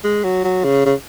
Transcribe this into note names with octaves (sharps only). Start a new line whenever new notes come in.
G#3
F#3
F#3
C#3
C#3